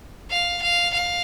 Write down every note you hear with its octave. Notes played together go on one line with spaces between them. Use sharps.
F5
F5
F5